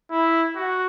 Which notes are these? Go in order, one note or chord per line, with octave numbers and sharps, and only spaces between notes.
E4
F#4